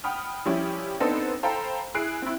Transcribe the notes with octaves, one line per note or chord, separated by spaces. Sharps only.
F#5 G5 B5 D#6 F6
F3 G3 C#4 E4 G4
B3 C4 D4 D#4 A4 C5
A4 C5 F5 G5 A#5 B5
E4 G#4 F#6 C7 D7
C4 E4